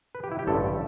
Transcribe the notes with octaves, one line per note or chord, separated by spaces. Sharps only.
B4
G4
E4
G4
A1 G2 D3 A4